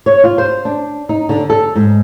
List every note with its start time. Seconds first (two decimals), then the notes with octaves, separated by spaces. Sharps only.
0.06 C#5
0.24 F4
0.38 C5
0.65 D4
1.09 D#4
1.29 D3
1.50 A4
1.76 G#2